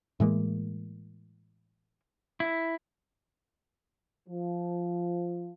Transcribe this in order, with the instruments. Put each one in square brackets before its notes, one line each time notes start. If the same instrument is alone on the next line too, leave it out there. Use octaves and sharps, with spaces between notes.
[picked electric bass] A2 E3 G#3 A#3
[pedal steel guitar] E4
[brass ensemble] F3